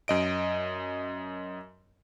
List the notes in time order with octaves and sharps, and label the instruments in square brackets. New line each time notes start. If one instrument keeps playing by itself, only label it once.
[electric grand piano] F#2 D#5 D7